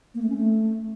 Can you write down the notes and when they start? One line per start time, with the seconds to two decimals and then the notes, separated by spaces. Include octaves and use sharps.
0.14 A#3
0.22 A3
0.29 C#4
0.37 A3